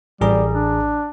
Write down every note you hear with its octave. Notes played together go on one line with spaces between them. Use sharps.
A1 G3 G#4 A#5
D4